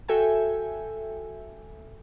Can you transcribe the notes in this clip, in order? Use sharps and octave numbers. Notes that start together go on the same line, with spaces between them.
F#4 A4 E5 G5 G#5